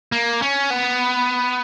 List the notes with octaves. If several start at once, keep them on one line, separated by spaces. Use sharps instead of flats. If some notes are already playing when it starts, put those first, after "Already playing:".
A#3
C#4
B3